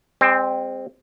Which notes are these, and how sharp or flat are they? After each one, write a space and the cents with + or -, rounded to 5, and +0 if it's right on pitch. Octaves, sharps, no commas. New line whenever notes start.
G#3 -40 C4 +0